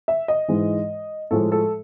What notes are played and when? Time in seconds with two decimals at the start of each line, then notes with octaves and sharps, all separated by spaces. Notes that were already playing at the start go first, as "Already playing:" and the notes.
0.08 E5
0.28 D#5
0.48 G#2 E3 G#3
1.31 A2 F3 G#3 A4
1.52 A4